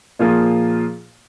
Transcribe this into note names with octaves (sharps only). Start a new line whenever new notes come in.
A#2 F3 A#3 F4 G#4